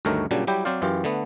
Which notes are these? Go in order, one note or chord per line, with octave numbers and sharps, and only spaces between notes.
D2 G2 D#3 A3 A#4 C#5
A#2 C#3 F#3 G3 D4
F#3 G3 E4 G4 G5
F#3 C4 C5 D5 F5
F#2 E3 F4 G4
D3 A3 B3